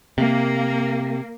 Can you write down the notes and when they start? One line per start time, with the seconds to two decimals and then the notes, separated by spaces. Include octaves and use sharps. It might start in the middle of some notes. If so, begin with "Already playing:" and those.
0.18 C3 A#3